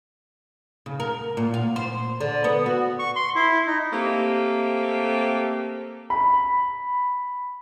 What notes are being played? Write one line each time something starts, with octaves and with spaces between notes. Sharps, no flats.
C#3
A#4
A#2
F5
C5
D3
B3
F#4
C#6
C6
E4
D#4
A3 A#3 C4 G4
B5